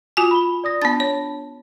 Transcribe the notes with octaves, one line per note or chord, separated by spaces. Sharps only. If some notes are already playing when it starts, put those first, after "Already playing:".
F4 F#4 G#5
B5 G7
D5 D#6 A#6
B3 D4 A5 B5 A6
C#5